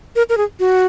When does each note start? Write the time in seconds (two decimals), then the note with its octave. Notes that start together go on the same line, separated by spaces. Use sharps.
0.16 A#4
0.29 A#4
0.37 G#4
0.60 F#4